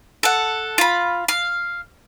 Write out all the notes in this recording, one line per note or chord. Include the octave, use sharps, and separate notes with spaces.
A4 F#5
F4 B5
F5